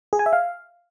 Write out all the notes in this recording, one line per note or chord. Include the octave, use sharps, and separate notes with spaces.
G#4
G#5
E5
F5